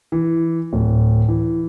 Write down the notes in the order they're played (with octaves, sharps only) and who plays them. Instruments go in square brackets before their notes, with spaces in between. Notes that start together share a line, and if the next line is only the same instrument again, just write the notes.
[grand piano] E3
D1
E3